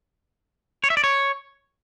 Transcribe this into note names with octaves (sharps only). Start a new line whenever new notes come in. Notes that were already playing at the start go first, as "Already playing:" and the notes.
C#5
E5
D5
C#5